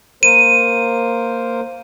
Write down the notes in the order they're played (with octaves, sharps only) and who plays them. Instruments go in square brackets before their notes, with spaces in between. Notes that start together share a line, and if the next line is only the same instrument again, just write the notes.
[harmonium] A#3 A#4 C5 [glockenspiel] D#7